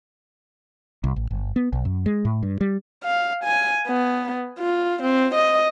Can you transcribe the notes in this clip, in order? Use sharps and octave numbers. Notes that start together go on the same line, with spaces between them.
C2
A1
G1
B3
B1
F#2
G#3
A2
G2
G3
F5
G#5
B3
F4
C4
D#5